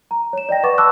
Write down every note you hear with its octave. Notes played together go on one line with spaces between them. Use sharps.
A#5
C#5 E7
D5 D#5 G5 A#6
B4 D5 F#5 C#6 D6 A6
A5 B5 C#6 D6 E6 F#6